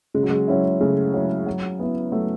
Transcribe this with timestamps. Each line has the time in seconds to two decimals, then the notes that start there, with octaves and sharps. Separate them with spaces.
0.14 C#3 G#3
0.23 F#3
0.30 G#3
0.48 F#3 C#4 E4
0.80 C#3 A3
1.14 F#3 C#4 E4
1.46 F#3
1.79 B3 E4
2.12 F#3 A3